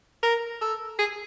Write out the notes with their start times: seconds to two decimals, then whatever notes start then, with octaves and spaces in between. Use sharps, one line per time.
0.23 A#4
0.61 A4
0.99 G#4